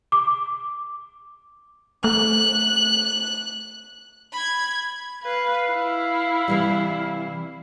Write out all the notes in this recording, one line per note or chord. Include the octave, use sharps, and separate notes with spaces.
D6
A3 F#6
B5 G#6
B4 F5
E4
C3 E3 G3